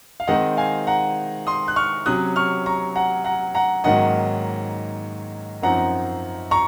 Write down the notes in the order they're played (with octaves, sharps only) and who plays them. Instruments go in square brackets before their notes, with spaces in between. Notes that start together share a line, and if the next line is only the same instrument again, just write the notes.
[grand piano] F5
D#3 G#3 C4 D#4 D#5 F#5
F5 G#5
F#5 A#5
C6 D#6
F#6
C#6 F6
C3 F#3 C#4 D#6 F#6
C#6 F6
A#5 C#6
F#5 A#5
F#5 A#5
F#5 A#5
G#2 D#3 F#3 A#3 C#4 D#5 F#5
F#2 F3 C4 D#4 F#5 A#5
A#5 C#6